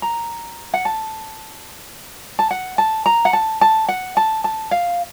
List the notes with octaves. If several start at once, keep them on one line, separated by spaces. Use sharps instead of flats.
A#5
F#5
A5
A5
F#5
A5
A#5
F#5
A5
A5
F#5
A5
A5
F5